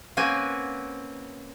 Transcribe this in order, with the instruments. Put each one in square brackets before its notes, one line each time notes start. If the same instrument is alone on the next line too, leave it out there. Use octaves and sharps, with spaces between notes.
[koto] A#3 C4 C#4 B4 F#5 G#5